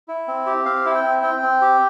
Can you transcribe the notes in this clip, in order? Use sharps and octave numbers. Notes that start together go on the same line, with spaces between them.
E4
C4
G4
C4 F5
E4
G5
C4
C4 G5
C4
G4